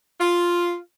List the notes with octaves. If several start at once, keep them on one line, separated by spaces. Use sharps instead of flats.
F4